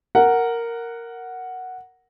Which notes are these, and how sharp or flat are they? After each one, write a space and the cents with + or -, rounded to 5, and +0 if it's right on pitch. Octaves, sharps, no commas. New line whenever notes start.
A#4 -5 F#5 +0